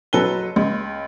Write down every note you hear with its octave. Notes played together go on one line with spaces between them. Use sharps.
F#1 F#3 A4 B4 G7
C#2